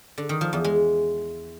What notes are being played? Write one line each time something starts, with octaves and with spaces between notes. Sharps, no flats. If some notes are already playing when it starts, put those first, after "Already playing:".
D3
D#3
F3
E2
G#3